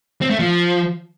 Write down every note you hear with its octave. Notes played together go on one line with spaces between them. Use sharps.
C4
A3
F3